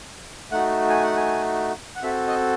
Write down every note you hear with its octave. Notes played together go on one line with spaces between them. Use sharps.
A3 D#4 F#4 F#5
G#5
F#5
G#5
F#5
C4 F#4 A4 E5
D#5